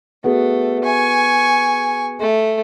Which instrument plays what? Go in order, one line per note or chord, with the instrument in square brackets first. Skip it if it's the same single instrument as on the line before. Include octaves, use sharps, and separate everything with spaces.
[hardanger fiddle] A3 [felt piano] B3 F#4 G#4
[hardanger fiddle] G#5 C#6
A3